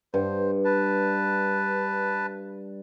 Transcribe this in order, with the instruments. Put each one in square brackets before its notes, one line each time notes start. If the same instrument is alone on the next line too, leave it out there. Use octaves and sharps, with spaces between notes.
[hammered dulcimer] G2 [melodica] C5
[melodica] B4 A5